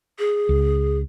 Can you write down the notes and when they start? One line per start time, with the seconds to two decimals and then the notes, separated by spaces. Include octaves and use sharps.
0.19 G#4
0.49 C#2